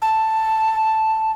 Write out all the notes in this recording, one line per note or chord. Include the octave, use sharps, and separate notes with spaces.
A5